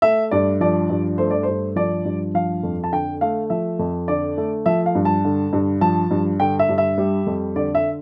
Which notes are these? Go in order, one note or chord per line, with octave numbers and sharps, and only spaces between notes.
A3 E5
G2 D5
F3 D5
G2
A3 C5
D5
G2 C5
F3 D5
G2
F3 F5
F2
A5
D3 G5
A3 F5
F3 E5
F2
D3 D5
A3
F3 E5
F5
G2
A5
D3
G2
F3 A5
G2
D3 G5
E5
G2
E5
G3
F2
D3 D5
E5